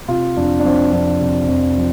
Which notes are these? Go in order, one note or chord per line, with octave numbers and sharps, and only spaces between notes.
C3 F4
F2 D4
D4
F3 C4
F2 D4
C3
F2
F3